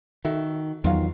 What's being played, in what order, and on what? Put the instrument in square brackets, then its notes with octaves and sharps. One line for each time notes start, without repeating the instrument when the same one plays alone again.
[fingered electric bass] D#3 [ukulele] F#4 A4 E5
[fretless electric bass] E2 F#3 [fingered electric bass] D#3 [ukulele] F4 F5